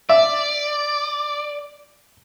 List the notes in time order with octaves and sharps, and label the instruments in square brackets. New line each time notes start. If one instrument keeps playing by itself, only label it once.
[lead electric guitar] D5 [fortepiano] E5